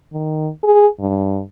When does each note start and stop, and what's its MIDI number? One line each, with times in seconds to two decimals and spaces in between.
0.13 0.49 51
0.63 0.86 68
1.00 1.42 43